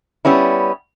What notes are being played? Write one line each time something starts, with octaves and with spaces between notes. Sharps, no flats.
G3 B3 C#4 E4